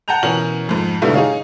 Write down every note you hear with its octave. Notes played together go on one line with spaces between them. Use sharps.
F#5 G5 A5 A#5 G6 F7
B2 E3 C#4 A#4 F#7
F2 G#2
G#2 B2 D3 G3 A3 E4
D#4 G#4 C#5 F5